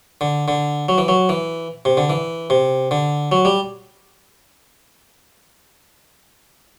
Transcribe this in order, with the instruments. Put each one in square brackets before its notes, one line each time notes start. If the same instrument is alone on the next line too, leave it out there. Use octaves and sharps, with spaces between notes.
[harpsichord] D3
D3
F#3
E3
F#3
E3
C3
D3
E3
C3
D3
F#3
G3